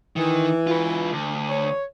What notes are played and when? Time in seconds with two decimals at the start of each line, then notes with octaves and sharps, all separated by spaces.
0.16 D#3 E3
0.67 F4 B4
1.13 D2
1.49 C#5